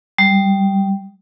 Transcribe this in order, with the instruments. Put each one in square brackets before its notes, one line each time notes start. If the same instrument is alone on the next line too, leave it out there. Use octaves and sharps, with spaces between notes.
[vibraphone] G3